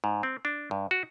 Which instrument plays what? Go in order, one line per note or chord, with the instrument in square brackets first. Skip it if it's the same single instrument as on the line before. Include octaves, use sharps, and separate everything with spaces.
[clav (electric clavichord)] G#2
C4
D4
G2
F#4